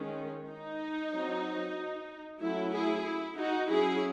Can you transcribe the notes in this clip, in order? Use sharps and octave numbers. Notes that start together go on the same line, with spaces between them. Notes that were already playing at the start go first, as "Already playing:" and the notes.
Already playing: D#3 G#3 C#4
D#4
F#3 C4
F#3 A3 C#4 E4
E4 G#4
E4
D#4 F#4
F#3 C#4 E4 G#4